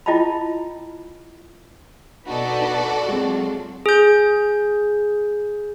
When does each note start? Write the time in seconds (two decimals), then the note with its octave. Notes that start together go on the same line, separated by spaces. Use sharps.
0.06 E4 F4 D#5 G5 A5 B5
2.26 B2 D#4 F#4 A4 B4 D5
3.08 F#3 G#3 C4 F4
3.86 G#4 G6